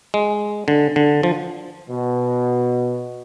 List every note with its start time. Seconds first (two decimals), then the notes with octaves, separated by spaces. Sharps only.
0.14 G#3
0.68 D3
0.96 D3
1.23 F3
1.90 B2